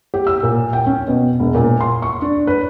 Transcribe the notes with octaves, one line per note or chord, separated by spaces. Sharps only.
G4
E6
A#2
G5
C#4
B2
E1
A#2
C6
C#6
D4
B4